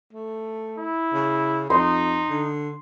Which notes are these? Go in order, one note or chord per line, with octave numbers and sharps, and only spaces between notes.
A3
E4
C#3
F2 D#4 C6
D3